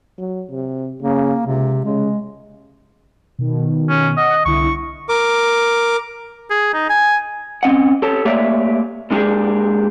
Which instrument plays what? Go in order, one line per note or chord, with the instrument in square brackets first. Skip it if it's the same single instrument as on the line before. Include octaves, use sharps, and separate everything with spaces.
[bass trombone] F#3
C3
[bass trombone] C#3 [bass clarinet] A#3
[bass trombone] C#2 [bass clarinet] C3
[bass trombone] C#3 [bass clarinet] G#3
[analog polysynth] B2 D#3
[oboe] C#4
[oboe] D#5 [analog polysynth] F#5
[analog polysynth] C2 D3 E4 [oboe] C#6
[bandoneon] A#4 D6
[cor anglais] G#4
D#4
G#5
[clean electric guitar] C4 C#4 D#5 F#5
G4 A4 C#5 A5
A3 A#3 G4 C#5 D5 E5
A#2 G#3 D4 D#4 G4 G#4